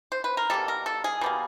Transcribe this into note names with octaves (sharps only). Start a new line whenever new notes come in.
C5
B4
A#4
B2 G3 A#3 A4
A#4
A4
G#4
B2 G3 A#3